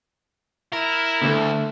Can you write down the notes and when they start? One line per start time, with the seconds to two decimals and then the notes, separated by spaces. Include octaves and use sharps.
0.73 E4 A#4
1.21 D2 D3 A3